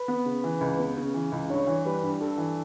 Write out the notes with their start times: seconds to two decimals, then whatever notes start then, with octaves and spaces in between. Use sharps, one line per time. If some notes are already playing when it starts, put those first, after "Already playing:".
Already playing: B4
0.08 B3
0.25 C#3
0.44 E3
0.61 C#2
0.79 B3
0.97 C#3
1.14 E3
1.32 C#2
1.49 G2 C#5
1.67 E3
1.85 G3 B4
2.03 G2
2.21 G2 A4
2.38 E3